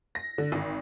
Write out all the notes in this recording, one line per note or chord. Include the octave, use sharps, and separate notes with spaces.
A#6
D3
G#1